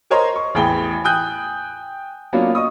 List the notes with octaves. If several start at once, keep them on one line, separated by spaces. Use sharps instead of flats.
A#4 C5 C#5 D#5 A#5 C6
C#6
A1 E2 G#4 G5 B5 G7
G5 G#5 D#6 F#6 G6
F#3 A#3 B3 C#4 D4 F4
D#5 C#6 D#6